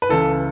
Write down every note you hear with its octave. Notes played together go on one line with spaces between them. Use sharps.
B4
C#2 C#3 E3 A4